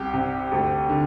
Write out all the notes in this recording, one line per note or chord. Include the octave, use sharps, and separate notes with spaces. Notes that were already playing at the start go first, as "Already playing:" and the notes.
Already playing: C2 G4
C3
D2
D3